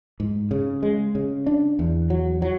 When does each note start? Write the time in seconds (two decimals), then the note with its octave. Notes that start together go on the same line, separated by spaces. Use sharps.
0.20 G#2
0.51 C#3
0.83 G#3
1.15 C#3
1.47 D4
1.79 E2
2.10 F#3
2.42 F#3